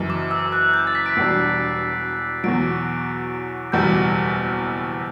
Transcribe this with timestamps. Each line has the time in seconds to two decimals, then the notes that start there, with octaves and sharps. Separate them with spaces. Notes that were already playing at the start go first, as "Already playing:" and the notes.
Already playing: F#1 F#2 E3
0.10 D6
0.31 E6
0.52 F#6
0.74 G6
0.87 A6
0.95 B6
1.06 D7
1.16 E1 E2 B2 G3 D4 C7
2.44 E2 B2 F#3 D7
3.72 F#1 E2 B2 G3 G6